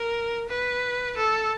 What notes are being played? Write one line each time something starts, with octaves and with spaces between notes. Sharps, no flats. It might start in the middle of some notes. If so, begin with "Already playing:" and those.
Already playing: A#4
B4
A4